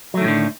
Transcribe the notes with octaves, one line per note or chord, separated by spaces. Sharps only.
A2 D3 D#3 F#3 A3